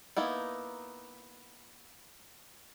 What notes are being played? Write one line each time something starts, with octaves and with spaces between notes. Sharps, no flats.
A#3 B3 D#4 E4